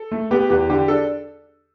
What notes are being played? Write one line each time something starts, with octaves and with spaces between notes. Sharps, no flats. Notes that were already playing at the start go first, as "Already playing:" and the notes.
Already playing: A4
A3
B3 G4 B4
E2 G4 B4
D3 G4
D4 A4